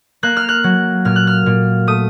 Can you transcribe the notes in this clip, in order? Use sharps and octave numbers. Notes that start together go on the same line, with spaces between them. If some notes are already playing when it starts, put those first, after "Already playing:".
A#3 F#6
F6
F#6
F#3
A#2 F6
F#6
F6
A#2
A3 D#6